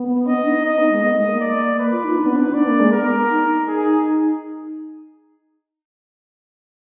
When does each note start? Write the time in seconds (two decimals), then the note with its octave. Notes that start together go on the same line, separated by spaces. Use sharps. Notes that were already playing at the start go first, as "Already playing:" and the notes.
Already playing: B3
0.27 D4 D#5
0.46 D#4
0.65 D#4 D#5
0.78 B3
0.91 G#3
1.03 B3 D#5
1.11 A#3
1.17 G#3
1.24 A#3
1.40 D5
1.79 B4
1.92 F4
2.04 D#4
2.17 D4 B4
2.26 B3
2.36 D4
2.45 D#4
2.54 D4 D5
2.67 A#3
2.80 G#3
2.92 B3 A#4
3.31 D#4
3.49 D#4
3.68 G#4